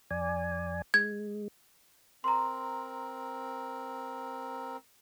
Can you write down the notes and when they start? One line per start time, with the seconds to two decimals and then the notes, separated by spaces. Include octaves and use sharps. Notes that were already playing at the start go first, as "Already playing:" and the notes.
0.11 F2 D5 G#5
0.94 G#3 G#6
2.24 C4 A#4 A#5 C6